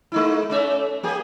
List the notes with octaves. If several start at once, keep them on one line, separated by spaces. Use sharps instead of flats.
G#3 D#4 E4
A3 C#4 E5
A#3 G4 G#4